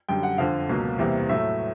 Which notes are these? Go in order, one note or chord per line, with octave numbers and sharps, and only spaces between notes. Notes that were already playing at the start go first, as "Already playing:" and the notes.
F#2 D3 G3 G5
F#5
F2 D3 F3 F5
C#2 B2 F#3 A#3
E2 C3 E3 G3 A#3
A2 F#3 A3 E5